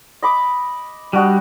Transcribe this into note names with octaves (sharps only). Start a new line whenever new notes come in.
D#5 B5 D6
G3 D4 F#4 D#5